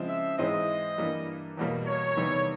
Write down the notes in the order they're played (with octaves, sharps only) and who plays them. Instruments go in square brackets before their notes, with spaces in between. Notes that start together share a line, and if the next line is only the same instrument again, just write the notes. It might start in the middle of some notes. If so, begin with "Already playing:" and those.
Already playing: [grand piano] C#3 F3 G#3 C4 E4
[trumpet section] E5
[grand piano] G#2 E3 G#3 C4 E4 [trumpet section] D#5
[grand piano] G2 E3 G3 A#3 D4
E2 B2 G3 A#3
[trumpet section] C#5
[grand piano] E2 C3 D#3 G3 B3